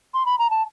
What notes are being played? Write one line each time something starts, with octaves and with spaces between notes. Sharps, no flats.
C6
B5
A#5
A5